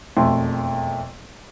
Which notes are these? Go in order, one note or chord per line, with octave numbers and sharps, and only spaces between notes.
E1 F2 A3 C6